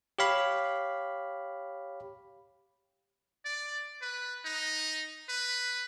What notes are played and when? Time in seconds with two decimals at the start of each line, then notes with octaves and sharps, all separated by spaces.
0.19 G4 C#5 F5 B5
3.45 D5
4.02 B4
4.45 D#4
5.29 B4